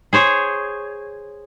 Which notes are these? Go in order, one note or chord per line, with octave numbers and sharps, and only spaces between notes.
G#4 C5 C#5